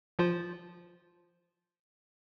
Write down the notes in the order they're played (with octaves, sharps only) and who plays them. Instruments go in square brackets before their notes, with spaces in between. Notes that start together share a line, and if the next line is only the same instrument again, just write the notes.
[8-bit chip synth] F3 F4 C5